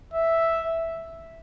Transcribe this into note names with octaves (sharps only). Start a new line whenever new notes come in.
E5